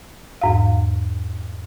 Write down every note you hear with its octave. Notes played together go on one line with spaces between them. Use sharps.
E2 G#2 F5